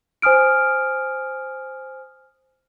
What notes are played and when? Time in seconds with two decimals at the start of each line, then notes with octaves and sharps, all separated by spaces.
0.22 C5 G#5 D#6 F6 D7